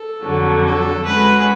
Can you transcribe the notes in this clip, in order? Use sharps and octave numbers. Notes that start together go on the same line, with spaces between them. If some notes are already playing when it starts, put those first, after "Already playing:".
Already playing: A4
F2 D3 F#3
A4
G#3 C#4 F#4 B4